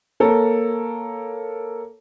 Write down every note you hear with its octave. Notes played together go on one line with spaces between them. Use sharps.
A#3 A4 A#4 C#5